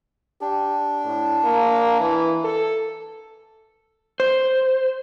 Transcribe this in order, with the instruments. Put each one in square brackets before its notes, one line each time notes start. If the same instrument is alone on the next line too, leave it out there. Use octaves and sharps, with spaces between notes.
[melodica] D4 [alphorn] G4
[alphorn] A2
A#3
E3
A4
[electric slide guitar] C5